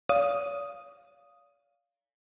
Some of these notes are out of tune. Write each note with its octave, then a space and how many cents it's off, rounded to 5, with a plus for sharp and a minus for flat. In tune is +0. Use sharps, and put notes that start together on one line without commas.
D5 -45 F5 +0 D#6 +0